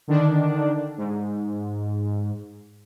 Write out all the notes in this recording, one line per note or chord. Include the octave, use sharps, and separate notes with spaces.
D3 D#3 D4
G#2